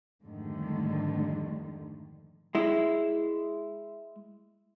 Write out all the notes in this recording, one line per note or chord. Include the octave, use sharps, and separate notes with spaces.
F2 G#2 D3 D#3 G3 A3
G#3 E4